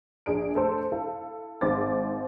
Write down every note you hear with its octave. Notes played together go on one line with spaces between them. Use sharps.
A#1 G#4 D5 D7
A3 A4 C5
E4 A4 F5
G#1 C5 D6 A6